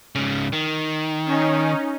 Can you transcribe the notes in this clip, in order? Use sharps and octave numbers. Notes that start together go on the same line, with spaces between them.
G#2 C#3
D#3
C#4 D#4